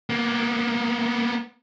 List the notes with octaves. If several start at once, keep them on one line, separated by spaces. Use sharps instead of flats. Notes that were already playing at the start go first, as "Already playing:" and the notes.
A#3 B3